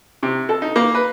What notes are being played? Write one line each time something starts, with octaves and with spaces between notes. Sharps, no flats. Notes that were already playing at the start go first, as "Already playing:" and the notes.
C3
A4
D#4
A#3
B4